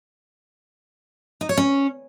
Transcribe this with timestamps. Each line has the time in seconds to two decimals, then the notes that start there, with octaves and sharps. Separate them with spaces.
1.41 D#4
1.49 C#5
1.57 C#4